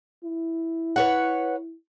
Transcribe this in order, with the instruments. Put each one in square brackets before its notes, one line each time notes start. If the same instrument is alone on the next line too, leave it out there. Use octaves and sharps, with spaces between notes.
[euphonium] E4
[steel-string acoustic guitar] B4 C#5 F#5